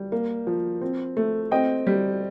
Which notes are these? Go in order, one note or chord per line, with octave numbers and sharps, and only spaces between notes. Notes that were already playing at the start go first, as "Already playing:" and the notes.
Already playing: G3
A#3
F3
C4
A3
C4 D#5 G5
G3